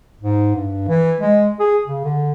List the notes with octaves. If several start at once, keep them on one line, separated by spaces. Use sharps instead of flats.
G#2
G2
E3
G#3
G#4
C#3
D3